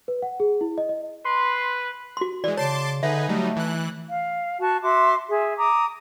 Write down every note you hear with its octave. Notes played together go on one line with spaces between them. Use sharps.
B4
F#5
G#4
E4
D#5
D#5
B4 C6
F#4 C6
E3 G#3 D5
C#3 C#5 A5 C6 D6
D3 D#4 G#4 B4 E5
F#3 G3 A3 D#4
E3 F#6
F5
F#4 A5 C#6
F#4 E5 C6 D6
G#4 E5
A#5 D6 D#6